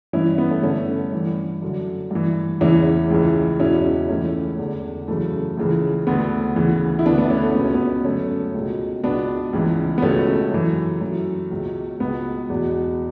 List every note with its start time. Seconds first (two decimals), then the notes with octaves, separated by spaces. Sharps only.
0.13 G2 E3 C#4 E4
0.38 B3
0.51 A3 C#4
0.63 G2 D3 A3 C#4
1.13 G2 E3
1.62 F#2 D3
2.11 G2 E3
2.60 E2 C#3 E3 C#4 E4
3.10 C#2 C#3 E3
3.60 E2 B2 C#4 E4
4.09 C#2 C#3 E3 A3 C#4
4.58 E2 D3
5.08 F#2 C#3 E3 A3
5.57 C#2 C#3 E3
6.07 D2 D3 B3
6.56 D2 C#3 E3
6.99 E4
7.06 D2 D3 B3 D4
7.18 B3 D4
7.30 A3 C#4
7.43 A3
7.55 C#2 B2 B3
7.65 C#4
7.75 B3
8.04 F#2 D3 A3 C#4
8.54 C#2 B2
9.04 C#2 B2 B3 D4
9.53 C#2 C#3 E3
9.98 B3
10.02 C#2 B2 A3 C#4
10.52 F#2 E3
11.01 F#2 E3
11.51 C#2 B2
12.00 C#2 B2 B3
12.50 E2 B2